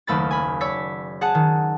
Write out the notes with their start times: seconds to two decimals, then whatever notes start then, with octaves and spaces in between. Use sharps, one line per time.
0.07 F#1 D#2 A3 B5 A6
0.31 G#5 B5
0.61 C#5 D5 E6 B6
1.21 G#4 F#5 A5
1.35 D#3